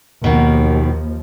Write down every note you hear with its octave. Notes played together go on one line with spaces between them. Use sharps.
D#2 B2 D#3 F3